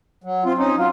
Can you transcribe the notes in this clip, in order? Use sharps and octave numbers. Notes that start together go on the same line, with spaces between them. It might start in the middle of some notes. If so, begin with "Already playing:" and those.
F#3
C4 F4
C#4 D#4
F#3 F4